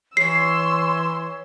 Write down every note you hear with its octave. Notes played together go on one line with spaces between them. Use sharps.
E3 C#5 C6 E6 C7